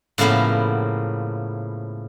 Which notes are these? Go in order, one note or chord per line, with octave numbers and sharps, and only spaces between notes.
A2 C#3 F3 A#3 B3